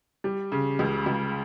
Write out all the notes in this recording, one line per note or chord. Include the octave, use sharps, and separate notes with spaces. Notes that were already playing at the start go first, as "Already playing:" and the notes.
G3
C#3
C#2
C#2